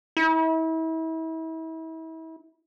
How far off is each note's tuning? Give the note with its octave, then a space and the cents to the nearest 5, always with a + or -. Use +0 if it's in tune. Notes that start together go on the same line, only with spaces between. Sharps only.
E4 -35